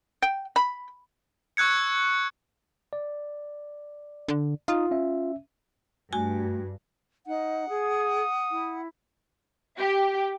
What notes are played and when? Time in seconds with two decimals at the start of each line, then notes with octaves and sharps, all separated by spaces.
0.22 G5
0.56 B5
1.57 C#6 E6 F#6 G#6 C#7
2.93 D5
4.28 D3
4.68 D#4 F4 D#6
4.91 C#4 E5
6.13 G2 A3 F#4 G#5
7.27 D#4 F#5
7.69 G#4 D#6
8.50 E4
9.78 G4